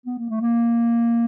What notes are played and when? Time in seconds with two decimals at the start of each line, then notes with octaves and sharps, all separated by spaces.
0.06 B3
0.18 A#3
0.30 A3
0.40 A#3